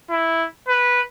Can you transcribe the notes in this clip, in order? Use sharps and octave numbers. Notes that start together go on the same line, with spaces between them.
E4
B4